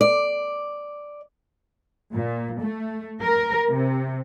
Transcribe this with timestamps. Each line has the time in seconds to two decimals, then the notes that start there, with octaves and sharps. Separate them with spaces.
0.01 D5
2.13 A#2
2.60 A3
3.22 A#4
3.70 C3